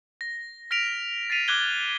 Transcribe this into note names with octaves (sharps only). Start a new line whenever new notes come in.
A#6
F6 A#6 B6 D7 F7
A6 B6 C7 D#7 F7
D6 F6 F#6 G#6 G7